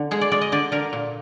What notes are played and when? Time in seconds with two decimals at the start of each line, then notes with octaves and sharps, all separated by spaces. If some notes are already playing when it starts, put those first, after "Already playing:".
Already playing: D3
0.11 G#3 G#4
0.21 D5
0.32 G#3 D5
0.41 D#5
0.52 D3 D5
0.72 D3 A#4
0.93 A#2